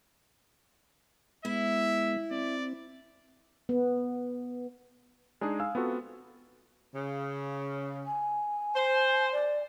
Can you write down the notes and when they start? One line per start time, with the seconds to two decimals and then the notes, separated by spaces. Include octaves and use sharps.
1.45 G#3 B3 E4 E5
2.31 C4 D5
3.69 B3
5.41 G#3 D4 D#4 G#4
5.60 G#4 F5 G#5 E6
5.75 B3 C4 F4 F#4 A4
6.95 C#3
8.06 G#5
8.75 C5
9.32 D5